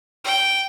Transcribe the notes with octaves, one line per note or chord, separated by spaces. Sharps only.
G5